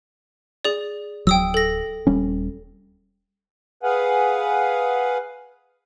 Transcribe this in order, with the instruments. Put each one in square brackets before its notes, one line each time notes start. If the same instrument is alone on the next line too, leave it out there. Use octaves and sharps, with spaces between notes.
[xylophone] G#4 D5
[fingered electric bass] D1 F#3 [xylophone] G5 D#6 E6
[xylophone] A4 A#6
[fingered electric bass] D#1 G3 C#4
[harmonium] G#4 B4 F5 F#5 G#5